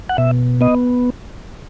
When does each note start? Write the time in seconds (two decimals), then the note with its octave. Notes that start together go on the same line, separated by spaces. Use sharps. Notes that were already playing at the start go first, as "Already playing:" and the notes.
0.09 F#5
0.18 B2 E5
0.61 B3 D#5